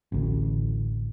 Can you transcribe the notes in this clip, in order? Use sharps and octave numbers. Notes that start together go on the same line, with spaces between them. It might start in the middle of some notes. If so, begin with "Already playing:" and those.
A1 D2